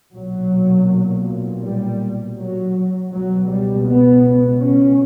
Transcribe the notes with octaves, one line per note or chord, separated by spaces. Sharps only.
B1 A#2 F#3
G3
F#3
C#2 B2 F#3
G3
B3
C#4